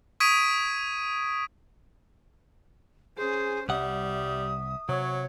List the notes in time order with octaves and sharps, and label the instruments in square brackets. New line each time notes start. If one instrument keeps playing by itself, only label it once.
[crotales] C#6 D#6 G#6 B6 D7 D#7
[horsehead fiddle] C#4 C5 [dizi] G#4
[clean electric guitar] C2 F#5 [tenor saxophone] G3 [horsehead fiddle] E5 [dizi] D#6
[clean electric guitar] C3 [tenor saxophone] F#3 [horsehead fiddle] C#5